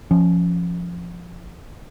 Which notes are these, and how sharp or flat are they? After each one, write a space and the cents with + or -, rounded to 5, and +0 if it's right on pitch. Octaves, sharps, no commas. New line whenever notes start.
F3 -5 C#4 +0